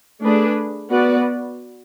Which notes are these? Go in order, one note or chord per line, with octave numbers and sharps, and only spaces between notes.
A3 D4 G#4 B4
B3 F#4 B4 D5